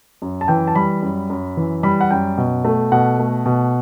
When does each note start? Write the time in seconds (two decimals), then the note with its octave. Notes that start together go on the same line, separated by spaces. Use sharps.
0.22 F#2
0.41 A5
0.48 E3 G5
0.67 A5
0.75 G3 B5
1.02 F#2
1.30 F#2
1.57 E3
1.83 G3 B5
2.01 F#5
2.11 F#2 G5
2.38 B2
2.65 A3
2.92 B2 F#5
3.19 A3
3.46 B2